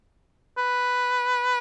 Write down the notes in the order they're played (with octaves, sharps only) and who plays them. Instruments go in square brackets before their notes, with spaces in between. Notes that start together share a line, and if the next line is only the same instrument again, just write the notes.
[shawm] B4